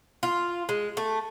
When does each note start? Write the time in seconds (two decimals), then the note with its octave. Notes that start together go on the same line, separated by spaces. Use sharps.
0.23 F4
0.69 G#3
0.97 A3